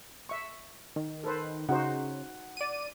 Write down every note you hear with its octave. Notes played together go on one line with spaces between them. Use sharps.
E5 C#6
D#3
A4 B4 C5
C#3 D#4 F#4 C5 F#5
D5 D#7